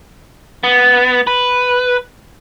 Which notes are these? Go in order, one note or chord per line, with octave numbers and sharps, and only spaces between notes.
B3
B4